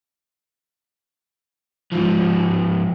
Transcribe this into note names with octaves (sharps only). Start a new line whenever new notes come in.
G#2 F3